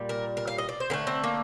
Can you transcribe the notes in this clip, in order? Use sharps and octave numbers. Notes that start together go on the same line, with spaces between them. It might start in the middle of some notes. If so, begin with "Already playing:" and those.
Already playing: A#2 G3
A#4
A#4
F5
D#5
D5
C5
D3 A3 A#4
C4
A#3